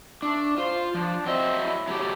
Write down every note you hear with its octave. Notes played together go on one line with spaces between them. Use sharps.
A3 D4
F4 C5
F3 D4
F#3 C4 D#5 E5
E4
F#3 A3 G4